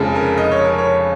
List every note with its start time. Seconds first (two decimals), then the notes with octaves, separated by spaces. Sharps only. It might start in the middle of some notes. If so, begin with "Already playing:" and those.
Already playing: F1 F2 C#3 G#3
0.15 A#4
0.38 D#5
0.52 C#5
0.65 A#4
0.78 C#5